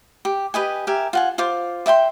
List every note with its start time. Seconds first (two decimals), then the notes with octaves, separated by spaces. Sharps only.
0.25 G4
0.54 G4 B4 D#5 G#5
0.87 G4 A#4 E5 G#5
1.13 F4 F#5 G#5
1.38 F4 C5 D6
1.86 D5 E5 G5 C6